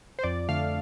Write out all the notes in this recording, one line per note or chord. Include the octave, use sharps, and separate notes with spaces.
C5
F2 D5
D3 A3 F5